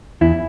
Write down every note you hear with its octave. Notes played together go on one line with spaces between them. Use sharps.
E2 E4